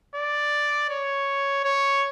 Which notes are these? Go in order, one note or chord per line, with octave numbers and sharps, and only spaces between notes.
D5
C#5
C#5